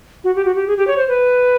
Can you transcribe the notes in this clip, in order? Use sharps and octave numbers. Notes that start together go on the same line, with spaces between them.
F#4
G4
F#4
G4
G#4
G4
C#5
C5
B4